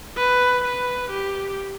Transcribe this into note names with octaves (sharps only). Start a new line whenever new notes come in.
B4
B4
G4